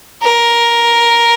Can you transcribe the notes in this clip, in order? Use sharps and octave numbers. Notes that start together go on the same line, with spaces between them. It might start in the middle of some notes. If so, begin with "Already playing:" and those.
A#4